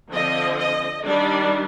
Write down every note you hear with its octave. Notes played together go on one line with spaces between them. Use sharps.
D3 F3 C4 D#5
D#5
D#3 G3 D4 D5